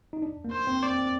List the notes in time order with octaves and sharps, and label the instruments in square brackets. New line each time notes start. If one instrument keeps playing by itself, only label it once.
[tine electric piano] D#4
D4
A#3
[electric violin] C5
[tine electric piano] C4
[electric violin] D5
[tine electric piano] C4